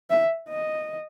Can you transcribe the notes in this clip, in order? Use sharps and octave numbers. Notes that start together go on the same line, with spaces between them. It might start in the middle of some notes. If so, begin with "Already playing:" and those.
E5
D#5